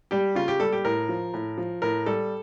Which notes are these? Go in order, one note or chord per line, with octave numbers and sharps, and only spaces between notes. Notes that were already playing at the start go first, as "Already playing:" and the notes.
G3 G4
C#3 F4
G4
G3 A4
G4
A2 A#4
F3
A2
F3
A2 A#4
G3 A4